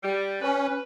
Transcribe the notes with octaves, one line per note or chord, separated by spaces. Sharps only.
G3
C#4 B4